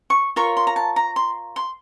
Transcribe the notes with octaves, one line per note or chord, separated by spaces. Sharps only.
C#6
F4 A#4 C#5 C#6
C6
A#5
A5
A#5
C6
C6